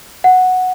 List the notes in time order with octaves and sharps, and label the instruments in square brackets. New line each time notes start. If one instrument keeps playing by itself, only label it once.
[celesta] F#5